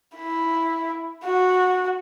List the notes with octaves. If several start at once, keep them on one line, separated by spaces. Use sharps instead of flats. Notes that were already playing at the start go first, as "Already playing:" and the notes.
E4
F#4